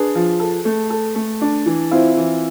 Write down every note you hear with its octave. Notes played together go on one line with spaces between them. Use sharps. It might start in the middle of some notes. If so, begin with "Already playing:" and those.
Already playing: D4 G#4 B4
F3
A4
A3
A4
A3
D4
E3
C4 E4 F4
E3